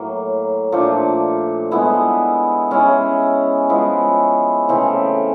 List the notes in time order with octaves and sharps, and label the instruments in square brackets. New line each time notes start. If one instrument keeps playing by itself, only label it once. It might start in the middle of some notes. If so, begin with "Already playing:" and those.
Already playing: [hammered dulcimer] A2 F#3 A#3
A#2 F3 A3 D4
G#3 B3 E4
G#3 C#4 E4
F3 G#3 B3 E4
C#3 E3 A3 C4